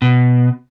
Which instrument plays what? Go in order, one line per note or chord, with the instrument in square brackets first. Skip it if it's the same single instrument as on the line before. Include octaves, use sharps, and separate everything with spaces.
[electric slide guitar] B2